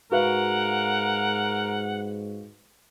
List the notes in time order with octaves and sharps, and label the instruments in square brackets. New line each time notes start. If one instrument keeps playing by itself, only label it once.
[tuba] G#2 [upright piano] F#4 B4 F5 [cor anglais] A#4 [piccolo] F#5